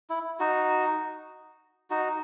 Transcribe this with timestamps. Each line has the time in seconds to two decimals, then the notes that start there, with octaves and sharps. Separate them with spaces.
0.10 E4
0.40 D#4 F#4
1.90 D#4 F#4